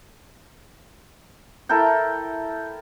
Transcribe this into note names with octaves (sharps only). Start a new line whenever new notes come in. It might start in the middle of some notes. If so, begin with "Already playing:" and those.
E4 A4 A#4 G5